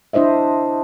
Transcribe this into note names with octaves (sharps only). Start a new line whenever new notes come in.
D4 E4 C5 D#5 E5